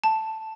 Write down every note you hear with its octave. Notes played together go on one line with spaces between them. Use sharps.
A5